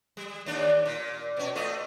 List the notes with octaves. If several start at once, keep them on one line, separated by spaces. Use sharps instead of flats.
G3
D#2 D4 D5
A#2
B2 C#4
A3 F4 D#5